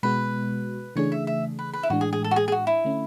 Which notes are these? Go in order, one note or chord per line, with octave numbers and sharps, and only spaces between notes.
B2 G#3 B3 F#4 B4
C#3 E3 A3 D4 G#4 C#5
E5
E5
B4
B4
E4
A2 E3 G#3 D4 F#4
G#4
G#4
A4
F#4
G#4
G#4
F#4
E4
D3 A3 C#4